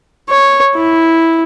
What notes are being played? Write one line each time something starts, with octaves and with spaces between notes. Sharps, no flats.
C#5
E4